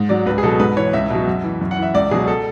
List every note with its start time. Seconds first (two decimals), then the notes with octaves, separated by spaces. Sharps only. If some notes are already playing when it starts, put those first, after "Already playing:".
Already playing: G#2
0.09 F#3 D5
0.26 C#2 B4
0.38 G#4
0.43 B2 F#3 A4
0.59 G#2 B4
0.76 E3 C#5
0.93 C#2 E5
1.10 B2 F#3
1.28 F#2
1.44 E3
1.61 F#2
1.71 F#5
1.77 E3
1.83 E5
1.94 C#2 D5
2.11 B2 F#3 G#4
2.28 A4